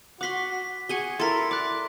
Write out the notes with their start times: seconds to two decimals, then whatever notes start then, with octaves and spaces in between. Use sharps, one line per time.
0.21 F#4 F#5 C6 D6 B6
0.89 F#4 G#4 G#5 C#6 G7
1.20 E4 A4 A#4 C6 A6 B6
1.51 D5 D6 F#6